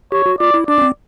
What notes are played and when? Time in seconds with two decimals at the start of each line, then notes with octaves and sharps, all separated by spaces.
0.12 G4 C#5
0.26 F#4
0.39 F4 D5
0.54 E4
0.68 D4 D5
0.78 C#4
0.82 C4